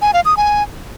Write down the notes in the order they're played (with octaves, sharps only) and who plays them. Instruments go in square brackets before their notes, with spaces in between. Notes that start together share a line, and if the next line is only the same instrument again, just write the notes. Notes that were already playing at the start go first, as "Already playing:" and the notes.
[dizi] G#5
F5
D#6
G#5